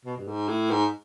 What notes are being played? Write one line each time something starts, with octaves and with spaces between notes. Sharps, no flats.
B2
G2
G#2
A2
G#2